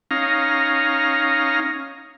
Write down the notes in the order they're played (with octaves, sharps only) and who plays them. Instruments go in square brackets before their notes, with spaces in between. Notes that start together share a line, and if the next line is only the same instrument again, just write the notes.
[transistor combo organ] C#4 D#4 F5 A#5